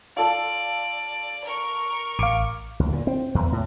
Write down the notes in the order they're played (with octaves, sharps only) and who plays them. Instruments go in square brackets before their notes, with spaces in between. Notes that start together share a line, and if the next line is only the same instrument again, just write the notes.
[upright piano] F4 A4 A5 [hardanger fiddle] D5
[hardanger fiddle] A#4 C#6
[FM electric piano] A1 F5 [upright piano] D6 C#7 D7
[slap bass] D2
A#2
C4
E2
A2